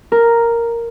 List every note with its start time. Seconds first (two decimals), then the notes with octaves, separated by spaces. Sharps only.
0.12 A#4